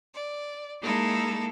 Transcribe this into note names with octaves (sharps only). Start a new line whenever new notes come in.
D5
G#3 A#3 D#4 E4 A4